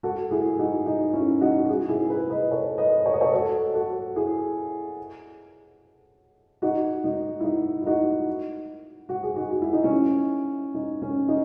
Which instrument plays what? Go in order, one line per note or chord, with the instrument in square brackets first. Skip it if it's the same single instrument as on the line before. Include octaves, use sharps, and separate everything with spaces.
[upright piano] F#4 A4
E4 G#4
D#4 F#4
D#4
C#4 E4
D#4 F#4
F#4
E4 G#4
E4 G#4
G#4 B4
B4 D#5
A4 C#5
B4 D#5
C#5
D#5
A4 C#5
F#4 A4
F#4 A4
E4 G#4
D#4 F#4
D#4
E4
D#4
E4
D#4 F#4
F#4
G#4
D#4 F#4
F#4
E4
D#4
C#4 E4
D#4
C#4
D#4